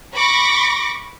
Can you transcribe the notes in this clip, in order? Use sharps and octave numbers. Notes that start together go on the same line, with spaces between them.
B5 C#6 D6 A#6